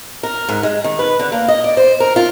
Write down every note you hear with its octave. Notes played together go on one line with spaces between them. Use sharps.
A#4
G#2
G#3
D#3
B4
D3
A#3
D#5
D5
C5
A#4
F4